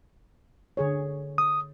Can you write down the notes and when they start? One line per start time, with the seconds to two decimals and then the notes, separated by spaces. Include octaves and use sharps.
0.77 D3 G#4 C#5
1.38 D#6